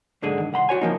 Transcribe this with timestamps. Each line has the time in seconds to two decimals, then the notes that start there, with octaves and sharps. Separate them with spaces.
0.22 B1 G#2 D3 G#4 G#5
0.40 D#3
0.53 C2 F#5 B5 C6
0.69 F#4 C#5 G#5
0.81 C#2 F3 A#3 D#4